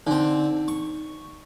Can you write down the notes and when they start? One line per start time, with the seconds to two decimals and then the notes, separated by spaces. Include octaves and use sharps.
0.07 D3 C4 D#4
0.68 C#6